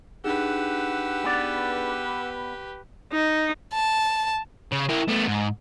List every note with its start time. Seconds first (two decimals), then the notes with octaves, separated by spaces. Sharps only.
0.24 D4 D#4 G4 G#4 B4 F#5 E6
1.25 B3 D5
3.13 D#4
3.74 A5
4.72 C#3
4.89 E4 A#4
5.08 A3 B3
5.28 G#2